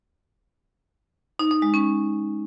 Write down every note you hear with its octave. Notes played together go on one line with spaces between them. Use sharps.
D#4
D#4
G#3
C#4